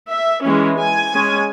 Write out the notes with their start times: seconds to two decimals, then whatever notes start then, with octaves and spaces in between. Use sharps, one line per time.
0.09 E5
0.44 E3 G#3 C#4
0.78 G#5
1.12 G#3 C#4